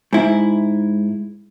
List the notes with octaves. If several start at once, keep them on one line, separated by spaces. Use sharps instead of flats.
G#2 E4